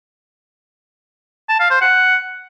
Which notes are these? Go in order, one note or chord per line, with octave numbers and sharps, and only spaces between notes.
A5
F5
C5
F#5